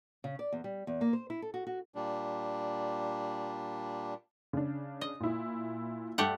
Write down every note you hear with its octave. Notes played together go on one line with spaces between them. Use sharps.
C#3
D5
E2
G3
E2
A#3
C5
E4
A4
F#4
F#4
A#2 G3 D4
C#3 D4
D#5
A#2 E4
G2 A3 G4 F#5